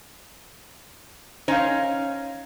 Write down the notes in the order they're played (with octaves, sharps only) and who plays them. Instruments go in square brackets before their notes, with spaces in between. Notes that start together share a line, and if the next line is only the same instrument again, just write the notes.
[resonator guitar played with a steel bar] C#4 D#4 [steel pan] C5 F5